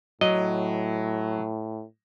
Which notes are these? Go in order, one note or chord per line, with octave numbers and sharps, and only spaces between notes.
A2 F#3 D#5